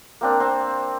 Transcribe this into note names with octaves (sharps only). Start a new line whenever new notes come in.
A#3 C4 D4
C4